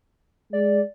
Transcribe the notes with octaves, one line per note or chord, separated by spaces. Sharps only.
G#3 D5